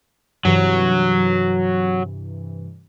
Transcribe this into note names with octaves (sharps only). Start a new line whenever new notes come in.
G2 C3 E3 F#3